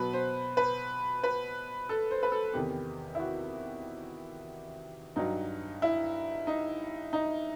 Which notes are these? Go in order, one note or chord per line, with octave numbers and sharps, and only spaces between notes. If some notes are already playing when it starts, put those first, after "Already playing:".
Already playing: B2 F#3 B4
C5
B4
B4
A4
C5
B4
A4
E2 C3 D#3 G4
E4
F#4
G2 F#3 D#4
E4
D#4
D#4